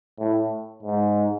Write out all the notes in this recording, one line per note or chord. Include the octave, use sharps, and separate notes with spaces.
A2
G#2